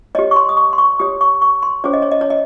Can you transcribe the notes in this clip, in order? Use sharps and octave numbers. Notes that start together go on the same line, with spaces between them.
G4 C#5 D#5
C#6
C6
D#6
C#6
C6
C#6
G4 C#5 D#6
C#6
C#6
C6
C#4 G#4 C5 C#5
D#5
C#5
D#5
C#5
D#5